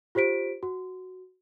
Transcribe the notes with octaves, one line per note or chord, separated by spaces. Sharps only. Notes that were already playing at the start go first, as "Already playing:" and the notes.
F4 G4 C5 B6 D7
F#4